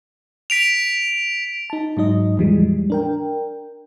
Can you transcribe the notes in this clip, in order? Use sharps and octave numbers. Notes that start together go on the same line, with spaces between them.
B6 D7 F7
D#4 A5
G#2 F#3 D#4 D#5
E2 A2 E3 F3 G3 G#3
D4 A#4 G5